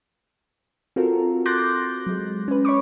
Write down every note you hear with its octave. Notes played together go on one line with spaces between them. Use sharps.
C4 F4 F#4 A4 A#4
C6 D6 F#6 G6 A6 A#6
F#3 G#3
C#4 B4
C#5 B5 C#6 D6